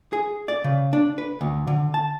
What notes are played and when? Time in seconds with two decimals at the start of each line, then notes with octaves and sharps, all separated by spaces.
0.13 G#4
0.48 D5
0.64 C#3
0.93 D4
1.18 B4
1.41 D2
1.67 D3
1.94 A5